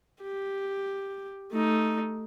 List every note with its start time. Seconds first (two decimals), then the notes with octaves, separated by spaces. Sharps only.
0.22 G4
1.52 A3 D#4